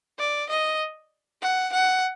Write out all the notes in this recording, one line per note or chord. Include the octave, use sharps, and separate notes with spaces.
D5
D#5
F#5
F#5